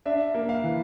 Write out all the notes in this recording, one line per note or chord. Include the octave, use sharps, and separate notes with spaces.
D4 E5
A#3
F5
E3